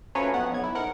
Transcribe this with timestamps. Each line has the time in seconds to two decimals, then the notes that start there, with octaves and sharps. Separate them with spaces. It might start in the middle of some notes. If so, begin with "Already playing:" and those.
0.15 F3 F#3 A3 C#4 B4 C#5
0.34 F2 B3 F#5
0.51 B1 G#6
0.64 E4
0.75 G#2 A#4 F#5